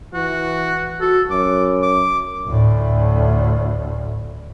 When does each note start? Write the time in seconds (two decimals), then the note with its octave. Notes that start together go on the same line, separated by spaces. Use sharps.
0.14 E3 F#4
1.01 F#4 A4
1.30 F#2 D6
1.83 D6
2.47 D2 A2